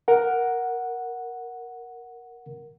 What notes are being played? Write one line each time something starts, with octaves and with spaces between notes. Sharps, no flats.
A#4 F#5